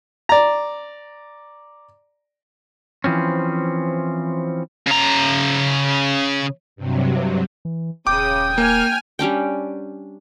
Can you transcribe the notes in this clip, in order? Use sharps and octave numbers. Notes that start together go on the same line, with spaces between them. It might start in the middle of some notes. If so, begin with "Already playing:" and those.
D5 A#5
E3 F3 C4 C#4
C#3 A#5
G2 C3 F#3
E3
D#1 C#3 G5 D6 D#6
A#3 G#5 F6
G3 C#4 D4 G5